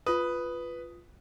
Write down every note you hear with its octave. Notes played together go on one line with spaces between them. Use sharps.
F4 B4 D#6